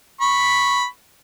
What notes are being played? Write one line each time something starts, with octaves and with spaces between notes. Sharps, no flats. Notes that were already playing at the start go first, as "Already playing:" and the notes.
B5 C#6